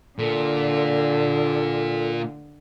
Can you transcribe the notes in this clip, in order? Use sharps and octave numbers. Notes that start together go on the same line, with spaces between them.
A#2 D3 A4